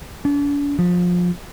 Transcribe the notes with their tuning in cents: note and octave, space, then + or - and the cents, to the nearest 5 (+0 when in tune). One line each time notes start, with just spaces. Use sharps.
D4 -45
F3 +25